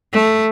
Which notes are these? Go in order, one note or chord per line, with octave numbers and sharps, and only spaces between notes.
A3